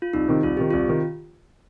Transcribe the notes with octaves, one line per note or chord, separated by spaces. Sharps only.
F4
C2 D#4
C3 D#3
C2 F4
C3 D#3 G4
C2 F4
C3 D#3